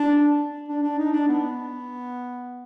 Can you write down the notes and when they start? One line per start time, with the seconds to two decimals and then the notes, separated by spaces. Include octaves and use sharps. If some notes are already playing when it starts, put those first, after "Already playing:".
Already playing: D4
0.68 D4
0.83 D4
0.98 D#4
1.13 D4
1.28 B3